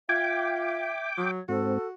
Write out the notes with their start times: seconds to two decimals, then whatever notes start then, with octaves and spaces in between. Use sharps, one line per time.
0.09 F4 E5 G5 D6 G#6
1.18 F#3
1.49 G#2 C4 F#4 A4